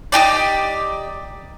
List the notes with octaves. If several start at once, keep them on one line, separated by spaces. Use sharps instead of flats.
D#4 F#4 G4 D5